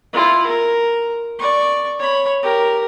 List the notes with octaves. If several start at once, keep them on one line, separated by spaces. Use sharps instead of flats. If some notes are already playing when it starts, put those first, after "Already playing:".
E4 F4
A#4
D5 C#6
C#5 B5
G4 A#4